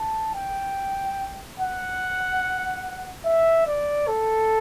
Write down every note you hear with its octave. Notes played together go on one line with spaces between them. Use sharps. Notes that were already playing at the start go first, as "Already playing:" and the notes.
Already playing: A5
G5
F#5
E5
D5
A4